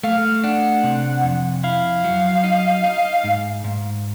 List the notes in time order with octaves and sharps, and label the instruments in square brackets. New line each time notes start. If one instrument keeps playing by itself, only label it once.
[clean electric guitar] A3 [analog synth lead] F5
[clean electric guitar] D4 [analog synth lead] F#5
[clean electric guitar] C3
F2
[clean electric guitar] E4 [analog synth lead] F5
[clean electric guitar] F#3
D#4
D#4
G#2
G#2